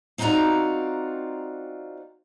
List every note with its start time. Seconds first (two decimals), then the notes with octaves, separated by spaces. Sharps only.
0.18 C4 D#4 F4 F#4 D5 A#5